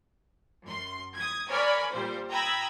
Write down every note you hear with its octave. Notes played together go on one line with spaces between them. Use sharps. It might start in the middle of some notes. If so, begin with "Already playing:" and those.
F#2 C6
D#6 G#6
A#4 C#5 D5 G#5 B5
A#2 G3 C5
G5 A#5 B5 D#6 E6 G#6